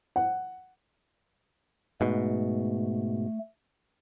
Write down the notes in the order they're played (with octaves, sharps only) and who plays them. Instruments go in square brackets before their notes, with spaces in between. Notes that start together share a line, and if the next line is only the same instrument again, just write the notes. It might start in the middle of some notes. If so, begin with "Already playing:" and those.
[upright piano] F#5
[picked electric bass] G#2 B2 [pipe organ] A3